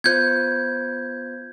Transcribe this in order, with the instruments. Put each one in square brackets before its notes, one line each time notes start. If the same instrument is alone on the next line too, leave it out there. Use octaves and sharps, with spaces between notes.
[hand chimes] B3 F4 C5 [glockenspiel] G6 G#6